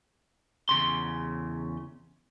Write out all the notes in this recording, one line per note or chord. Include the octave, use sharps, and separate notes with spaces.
E2 C#3 C6